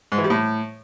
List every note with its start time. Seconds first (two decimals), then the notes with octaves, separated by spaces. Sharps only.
0.12 G#2
0.18 E3
0.24 G3
0.30 A2